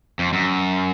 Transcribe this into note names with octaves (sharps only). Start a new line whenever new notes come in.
F2
F#2